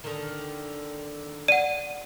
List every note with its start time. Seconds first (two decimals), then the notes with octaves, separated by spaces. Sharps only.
0.04 D3 D#3
1.48 D5 F#5 D#7